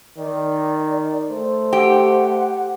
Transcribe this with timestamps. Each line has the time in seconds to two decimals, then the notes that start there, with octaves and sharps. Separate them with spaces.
0.18 D#3 D5
1.30 A3 C5
1.73 G4 F#5